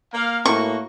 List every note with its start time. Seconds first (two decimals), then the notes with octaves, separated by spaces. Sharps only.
0.14 A#3 F5
0.46 A2 A#3 F#4 C#6